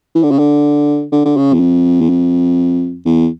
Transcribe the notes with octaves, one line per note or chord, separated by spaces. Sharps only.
E3
D3
C#3
D3
D3
D3
C#3
E2
F2
E2
F2
E2